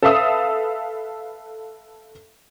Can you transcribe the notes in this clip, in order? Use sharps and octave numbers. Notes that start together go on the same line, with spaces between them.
A4 B4 E5 F5 D#6 E6